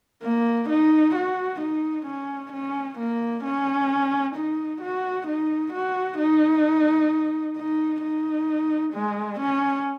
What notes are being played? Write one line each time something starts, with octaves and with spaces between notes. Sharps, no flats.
A#3
D#4
F#4
D#4
C#4
C#4
A#3
C#4
D#4
F#4
D#4
F#4
D#4
D#4
D#4
G#3
C#4